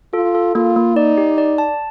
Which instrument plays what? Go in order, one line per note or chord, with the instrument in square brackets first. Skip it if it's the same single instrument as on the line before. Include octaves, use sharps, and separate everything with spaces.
[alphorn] F4 [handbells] A4
[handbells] A4
[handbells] A#3 [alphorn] F4
[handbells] A#3
[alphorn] D#4 [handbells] D5
[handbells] G4
D5
A5